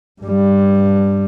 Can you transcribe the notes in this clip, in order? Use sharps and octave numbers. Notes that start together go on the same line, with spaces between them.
G2 G3